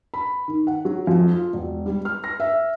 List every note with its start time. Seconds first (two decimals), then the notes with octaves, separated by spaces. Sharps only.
0.14 B5
0.48 D#3
0.67 F#5
0.85 F#3
1.07 F2
1.34 F4
1.53 E1
1.86 G3
2.05 F6
2.24 A#6
2.40 E5